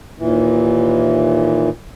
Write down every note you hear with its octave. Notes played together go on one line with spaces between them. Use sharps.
D#2 A#2 E3